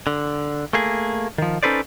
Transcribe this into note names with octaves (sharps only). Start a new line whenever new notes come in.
D3
A3 A#3 G#4
D#3 F3
C#4 D#4 A4 B4 C5 D5